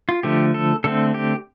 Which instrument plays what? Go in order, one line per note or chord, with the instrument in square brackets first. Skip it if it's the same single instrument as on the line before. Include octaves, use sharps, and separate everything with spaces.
[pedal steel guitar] F4
D3 F3 A3 G4
A4
D3 A3 C4 A4
G4